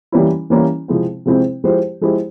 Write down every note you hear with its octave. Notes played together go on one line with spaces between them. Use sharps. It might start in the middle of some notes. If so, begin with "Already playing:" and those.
E3 G3 A#3 C#4 E4
E3 G3 A#3 C#4 E4
C3 F3 G#3 C4 E4
C3 F3 G#3 C4 E4
F3 G#3 E4 G4 C5
F3 G#3 E4 G4 C5